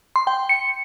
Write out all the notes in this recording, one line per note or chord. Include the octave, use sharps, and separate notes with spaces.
C6
G5
C#7